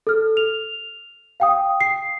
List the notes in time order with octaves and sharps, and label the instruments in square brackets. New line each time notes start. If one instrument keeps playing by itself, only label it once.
[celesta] A4 F6
F7
F5 G5 D#6
C7